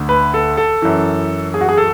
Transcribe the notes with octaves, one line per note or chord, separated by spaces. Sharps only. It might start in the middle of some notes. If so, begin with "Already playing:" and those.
Already playing: D2 D3
B4
A4
A4
F#2 E3
G#4
F#4
G#4
A4